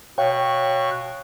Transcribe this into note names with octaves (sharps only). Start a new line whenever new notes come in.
B2 C#5 F5 G5 C#6 F#6